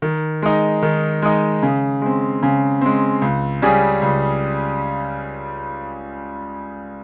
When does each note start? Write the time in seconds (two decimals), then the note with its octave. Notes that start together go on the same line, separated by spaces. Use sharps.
0.02 D#3
0.42 G#3 D#4
0.83 D#3
1.22 G#3 D#4
1.63 C#3
2.02 G#3 C4
2.43 C#3
2.81 G#3 C4
3.22 C#2
3.62 C#3 G3 C#4 G#4
4.02 C#2